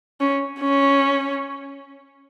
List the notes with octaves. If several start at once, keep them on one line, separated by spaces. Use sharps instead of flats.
C#4
C#4